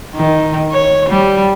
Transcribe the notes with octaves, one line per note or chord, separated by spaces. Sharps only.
D#3
C#5
G3